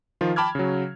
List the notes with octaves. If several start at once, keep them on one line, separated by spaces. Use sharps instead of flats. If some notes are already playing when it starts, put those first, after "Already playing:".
D#3 F3 F4
G5 A5 B5 D6 F6 G#6
C#3 F#3